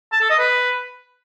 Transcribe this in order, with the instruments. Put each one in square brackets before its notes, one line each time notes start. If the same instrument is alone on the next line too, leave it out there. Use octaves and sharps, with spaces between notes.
[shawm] A5
A4
D#5
B4